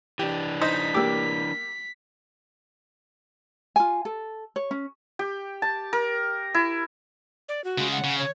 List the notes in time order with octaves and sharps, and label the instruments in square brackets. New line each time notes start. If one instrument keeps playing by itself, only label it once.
[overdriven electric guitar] E3 D4 [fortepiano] G4
[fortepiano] D#4 C5 [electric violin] B6
[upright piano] A#3 G4 [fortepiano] D6 E6
[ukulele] F4 G#5
A4
C#5
C#4
[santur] G4
A5
A#4
E4
[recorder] D5
F#4
[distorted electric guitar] C#3 G#3
[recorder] F#5
[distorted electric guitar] C#3
[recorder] C#5